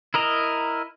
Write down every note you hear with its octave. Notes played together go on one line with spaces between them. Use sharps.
E4 A#4 D#5 A#5